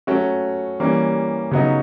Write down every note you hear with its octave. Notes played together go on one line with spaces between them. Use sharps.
F#3 A3 C#4 F#4
E3 G3 A#3 C#4
C#3 F#3 B3 D#4